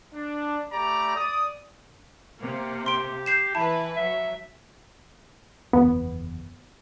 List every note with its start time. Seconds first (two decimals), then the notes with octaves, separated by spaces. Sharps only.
0.13 D4
0.73 A3 G4 D5 A#5 B5
1.16 D5 D#6
2.38 C3 A#3
2.86 G4 C6 D7
3.26 G6 C7 E7
3.55 E3 E4 B4 A5
3.96 F#3 E5
5.73 F#1 E2 B3